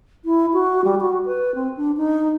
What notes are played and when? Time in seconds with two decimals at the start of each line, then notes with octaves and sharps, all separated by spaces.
0.25 E4
0.53 F#4
0.84 G3
1.01 F#4
1.25 B4
1.55 C4
1.77 D4
1.97 D#4